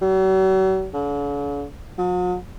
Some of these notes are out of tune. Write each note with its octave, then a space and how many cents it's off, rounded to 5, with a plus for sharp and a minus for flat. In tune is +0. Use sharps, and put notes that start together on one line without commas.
F#3 +45
D3 -45
F#3 -45